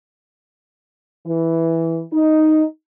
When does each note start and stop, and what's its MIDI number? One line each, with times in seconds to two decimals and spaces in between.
1.27 2.01 52
2.12 2.63 63